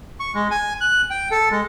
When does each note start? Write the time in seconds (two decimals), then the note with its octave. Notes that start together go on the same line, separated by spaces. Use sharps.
0.20 C#6
0.35 G#3
0.51 G#5
0.81 F#6
1.10 G5
1.31 A4
1.51 G#3